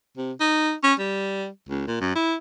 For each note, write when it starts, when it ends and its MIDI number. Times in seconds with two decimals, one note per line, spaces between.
0.17 0.32 48
0.41 0.74 63
0.83 0.94 61
0.99 1.48 55
1.69 1.83 37
1.87 2.00 46
2.01 2.14 42
2.15 2.36 64